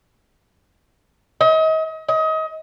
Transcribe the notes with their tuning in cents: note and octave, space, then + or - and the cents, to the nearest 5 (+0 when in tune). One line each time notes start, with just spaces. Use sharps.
D#5 +35
D#5 +30